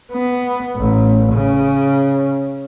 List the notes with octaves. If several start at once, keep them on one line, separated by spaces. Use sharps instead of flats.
B3
A1
C#3